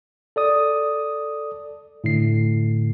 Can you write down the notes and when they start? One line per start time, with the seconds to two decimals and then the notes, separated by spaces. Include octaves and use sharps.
0.36 A4 D5 D#6
2.04 A2 D3 C7